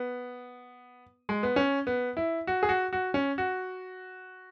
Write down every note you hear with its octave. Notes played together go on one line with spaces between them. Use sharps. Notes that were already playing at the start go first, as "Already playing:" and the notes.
Already playing: B3
G#3
B3
C#4
B3
E4
F#4
G#4
F#4
F#4
C#4
F#4